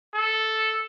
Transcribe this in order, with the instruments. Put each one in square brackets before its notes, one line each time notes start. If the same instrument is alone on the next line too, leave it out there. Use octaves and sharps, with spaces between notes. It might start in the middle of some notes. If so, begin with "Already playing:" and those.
[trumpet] A4